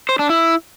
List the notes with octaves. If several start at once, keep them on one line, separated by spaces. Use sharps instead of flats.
C5
D4
E4